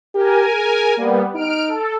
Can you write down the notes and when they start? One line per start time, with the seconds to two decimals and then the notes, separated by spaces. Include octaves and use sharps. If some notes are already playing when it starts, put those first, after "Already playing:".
0.15 G4 A#4 G#5
0.53 G#4
0.98 G3 A#3 B3
1.34 D#4 F6 D7
1.68 A4